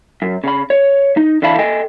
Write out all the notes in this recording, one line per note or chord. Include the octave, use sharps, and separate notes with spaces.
F#2
C#3 B5
C#5
D#4
D3 E3 E4 F5 A5 B5
A4 D#5 G5 G#5